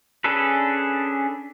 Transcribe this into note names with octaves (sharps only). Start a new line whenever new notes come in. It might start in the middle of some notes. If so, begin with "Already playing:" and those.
C#4 D4 G#4 A4 B4